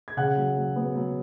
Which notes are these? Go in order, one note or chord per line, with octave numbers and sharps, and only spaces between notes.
G#6
C#3 F#5 F#6
F#3
F#3
B3
F#3